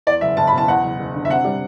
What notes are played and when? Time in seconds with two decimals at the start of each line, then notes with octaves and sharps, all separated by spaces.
0.07 E2 D5
0.21 F#1 E5
0.37 F#1 A5
0.47 B5
0.52 B2
0.58 A5
0.68 E2 F#5
0.84 F#1
0.99 F#1
1.15 D3
1.25 E5
1.30 C3 F#5
1.45 G3